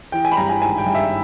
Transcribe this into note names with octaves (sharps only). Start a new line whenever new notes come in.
E3 G5
G#5
B5
G2 A#5
G#5
G#1 G#5
G5
G2
E5